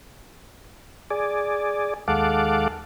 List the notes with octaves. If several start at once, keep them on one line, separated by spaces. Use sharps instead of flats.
G#4 D5
D#2 G#3 A4 F5 F#5 D6